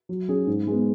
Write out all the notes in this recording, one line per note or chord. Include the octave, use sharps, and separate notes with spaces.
F#3
C#4 G#4
G#2
G#3 B3